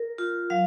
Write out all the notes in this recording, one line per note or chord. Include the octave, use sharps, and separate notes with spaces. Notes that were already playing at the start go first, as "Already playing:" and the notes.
Already playing: A#4
F4
F#3 F5